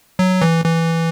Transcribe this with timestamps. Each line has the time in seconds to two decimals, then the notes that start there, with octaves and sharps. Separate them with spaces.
0.19 F#3
0.42 E3
0.65 E3